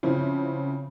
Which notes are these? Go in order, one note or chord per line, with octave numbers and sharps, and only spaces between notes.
C#3 F3 C4 E4 C5